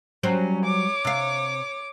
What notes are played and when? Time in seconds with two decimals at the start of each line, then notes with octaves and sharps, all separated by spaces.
0.23 F#3 G3 C#4 C5
0.64 C#5 D6
1.05 C3 F5